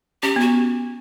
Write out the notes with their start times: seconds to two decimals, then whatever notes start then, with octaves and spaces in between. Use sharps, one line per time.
0.23 C#4 G4
0.36 B3 F#4